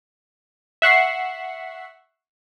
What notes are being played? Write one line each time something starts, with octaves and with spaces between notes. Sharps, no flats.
E5 F#5 C#6 C7